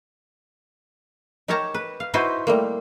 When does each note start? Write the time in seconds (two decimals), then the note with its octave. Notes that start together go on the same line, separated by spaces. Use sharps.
1.48 D#4 G4 A#4 C#5 A5 A#5
1.74 B4
2.00 F5
2.14 D#4 E4 F#4 B4 C5
2.47 G3 A3 A#3